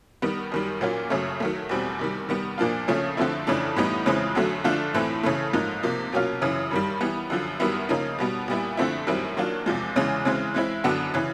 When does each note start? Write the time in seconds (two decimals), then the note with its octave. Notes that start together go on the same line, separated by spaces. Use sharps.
0.22 D#3 G3 B3
0.52 F#2 D#3 G3
0.81 A#2 F#3 A#3 C#4 F4
1.10 F#2 C#3 F#3 A3
1.40 D#3 F#3 A3
1.69 E2 B2 G3 C4
1.99 C3 D#3 G3
2.29 D#3 G3 B3
2.58 A#2 F3 A#3 D4 F4
2.88 C#3 F3 A3 C#4
3.17 D3 F3 A3 C4 E4
3.47 F2 C#3 E3 A3 D4
3.76 A2 E3 G3 B3 D#4
4.06 F2 C#3 E3 G#3 C4
4.35 F#2 D3 F#3 A3
4.64 D3 F3 A3 D4 F4
4.94 A2 E3 A3 C4
5.23 C#3 E3 A3
5.53 G#2 F3 A#3 D#4
5.83 C3 F3 A#3
6.12 B2 F#3 A#3 C#4 F4
6.42 F#2 C#3 E3
6.71 G2 D#3 G3
7.01 E3 G3 B3
7.30 F#2 D3 F3
7.60 F#2 D#3 G3 B3 E4
7.89 C#3 F3 A#3 D#4
8.18 B2 G3 B3
8.48 A#2 G3 B3 E4
8.77 D3 F3 A3 C4 E4
9.07 F#2 D#3 G3 C4 E4
9.37 D#3 F#3 A#3 D4 F4
9.66 E2 C3 F3 G#3
9.96 E2 C#3 E3 G#3
10.25 C#3 E3 G#3 C4
10.54 E3 G#3 C4 E4
10.84 F#2 D3 F#3 B3 D4
11.14 C#3 E3